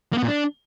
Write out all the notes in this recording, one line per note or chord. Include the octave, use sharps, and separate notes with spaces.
A#3
B3
A#2
D4